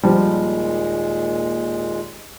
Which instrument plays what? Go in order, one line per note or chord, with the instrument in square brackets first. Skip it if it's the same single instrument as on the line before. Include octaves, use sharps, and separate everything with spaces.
[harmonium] D#2 A#2 G#3 [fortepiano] F3 G3